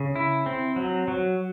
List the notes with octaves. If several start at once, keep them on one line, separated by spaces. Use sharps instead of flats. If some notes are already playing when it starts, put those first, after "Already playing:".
Already playing: C#3
E4
C4
F#3
F#3